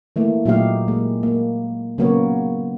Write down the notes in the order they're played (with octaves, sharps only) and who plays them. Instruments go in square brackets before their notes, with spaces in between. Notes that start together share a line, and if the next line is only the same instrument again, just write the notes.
[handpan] E3 A3 A#3
A#2 F#3 A3 D#4 G4 F5
G#3 A#3
A#3
C#3 F#3 A#3 B3 A#4 C#5